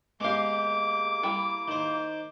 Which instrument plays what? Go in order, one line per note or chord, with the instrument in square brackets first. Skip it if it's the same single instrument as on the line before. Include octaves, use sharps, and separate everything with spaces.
[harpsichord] G#3 G4 [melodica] A#3 [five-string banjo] B3 F5 [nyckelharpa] D6
[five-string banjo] G3 E4 G5
[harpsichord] D#3 C5